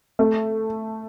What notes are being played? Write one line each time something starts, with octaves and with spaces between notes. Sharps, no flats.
A3